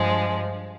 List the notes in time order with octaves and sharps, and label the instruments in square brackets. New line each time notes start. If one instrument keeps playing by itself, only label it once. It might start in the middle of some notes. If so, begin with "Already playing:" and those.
Already playing: [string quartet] G2 F3 G#3